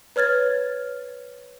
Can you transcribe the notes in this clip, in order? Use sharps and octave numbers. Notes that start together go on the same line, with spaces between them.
B4 C#5 F6 G#6 A6